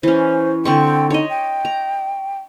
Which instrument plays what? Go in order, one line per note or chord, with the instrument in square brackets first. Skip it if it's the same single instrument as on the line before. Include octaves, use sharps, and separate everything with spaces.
[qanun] E3 C#4 [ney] C5
[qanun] D3 C4 C#6 [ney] G5
[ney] D#4 [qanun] C#5 D#5
[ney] G5
[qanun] A#5